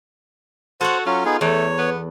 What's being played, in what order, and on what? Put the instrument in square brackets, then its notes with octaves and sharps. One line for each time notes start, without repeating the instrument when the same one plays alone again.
[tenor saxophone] F#4 [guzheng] A4 C#5 F#5 [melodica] C5
[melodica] F#3 C#4 [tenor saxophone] F4
[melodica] B3 D#4 G#4
[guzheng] E2 [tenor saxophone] A3 [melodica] C#5
[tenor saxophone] B3